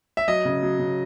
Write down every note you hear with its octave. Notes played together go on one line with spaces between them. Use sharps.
E5
F#3 D#5
C#3
F#3
C#3